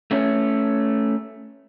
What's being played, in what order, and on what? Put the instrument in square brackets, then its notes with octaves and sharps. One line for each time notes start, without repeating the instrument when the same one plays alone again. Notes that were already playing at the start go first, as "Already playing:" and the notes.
[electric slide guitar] A3 C#4 C#5